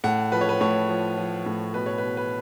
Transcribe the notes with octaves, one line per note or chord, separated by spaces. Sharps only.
A2 F#5
F3 B4
C#5
B4
A2 C#5
F3
F3
A2
B2 B4
C#5
B4
B2
B4